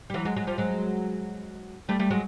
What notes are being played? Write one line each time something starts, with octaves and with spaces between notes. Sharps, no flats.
G3
E3 F#3
F#3 G#3
F#3 G#3
F3 G3
F#3 G#3
G3 A3
G3 A3
F#3 G#3